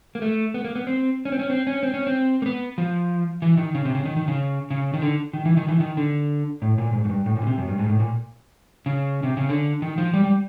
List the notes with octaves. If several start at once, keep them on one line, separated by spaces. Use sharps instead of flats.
A#3
A3
B3
A#3
B3
C4
C#4
C4
C#4
C4
C#4
C4
C#4
C4
A#3
B3
F3
E3
D#3
C#3
C3
C#3
D#3
D#3
C#3
C#3
D#3
D3
D#3
E3
D#3
E3
D#3
D3
A2
A#2
G#2
F#2
G2
A2
A#2
C#3
C3
F#2
G2
G#2
A2
A#2
C#3
C3
C#3
D3
D#3
F3
G3
G3